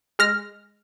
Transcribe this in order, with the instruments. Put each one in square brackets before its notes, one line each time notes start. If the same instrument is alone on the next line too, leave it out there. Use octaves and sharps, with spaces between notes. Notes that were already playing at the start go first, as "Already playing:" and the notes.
[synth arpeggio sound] G#3 F6 A#6